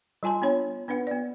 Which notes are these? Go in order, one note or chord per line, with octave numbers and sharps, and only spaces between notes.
G3 F4 G#5 A5 C6
B3 D4 C#5
B3 D4 B4 F#5
B3 D5